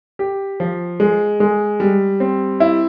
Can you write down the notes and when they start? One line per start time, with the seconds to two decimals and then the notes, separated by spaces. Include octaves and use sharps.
0.19 G4
0.60 F3
1.00 G#3
1.40 G#3
1.80 G3
2.20 C4
2.60 E4